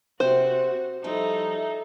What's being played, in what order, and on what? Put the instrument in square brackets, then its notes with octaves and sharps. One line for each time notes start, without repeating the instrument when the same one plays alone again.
[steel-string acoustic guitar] C3 C4 G4 [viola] F#4 [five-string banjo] C5
[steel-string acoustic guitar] F3 G3 E4 [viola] D#4 A4